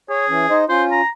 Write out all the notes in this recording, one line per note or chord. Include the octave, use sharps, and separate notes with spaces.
G#4 C#5
E3 C#4
D#4 C5 D#5
C#4 F4 C5
A#5